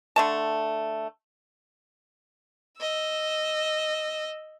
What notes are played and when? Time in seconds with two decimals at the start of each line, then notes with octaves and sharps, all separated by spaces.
0.16 D3 A3 A5
2.80 D#5 E6